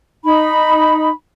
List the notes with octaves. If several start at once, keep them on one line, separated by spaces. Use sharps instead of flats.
D#4 B5